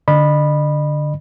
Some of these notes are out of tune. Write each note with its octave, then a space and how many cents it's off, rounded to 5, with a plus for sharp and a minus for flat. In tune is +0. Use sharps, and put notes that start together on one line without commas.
D3 +0 D#5 -40 B5 -5